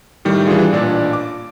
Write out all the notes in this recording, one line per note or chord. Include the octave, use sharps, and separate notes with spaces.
A2 D#3 G3
E3 G3 D4 F4 G#4
A1 A#2 D4 D5
D6